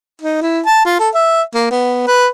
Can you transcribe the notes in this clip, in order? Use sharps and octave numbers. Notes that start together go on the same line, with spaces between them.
D#4
E4
A5
F4
A4
E5
A#3
B3
B4